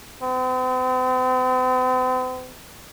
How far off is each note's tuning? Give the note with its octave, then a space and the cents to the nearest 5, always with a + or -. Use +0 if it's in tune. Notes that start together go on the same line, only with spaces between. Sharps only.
C4 -45